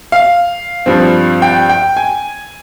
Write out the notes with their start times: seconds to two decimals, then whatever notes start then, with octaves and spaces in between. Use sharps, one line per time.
0.12 F5
0.86 G2 F3 C4
1.42 G5
1.69 G5
1.97 G#5